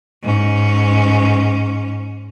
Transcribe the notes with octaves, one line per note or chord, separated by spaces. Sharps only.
G#2 C#4